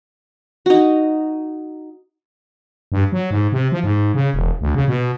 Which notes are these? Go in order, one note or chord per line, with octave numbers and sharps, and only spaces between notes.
D#4 F#4
G2
F#3
G#2
C3
F3
G#2
C#3
E1
D2
C#3
B2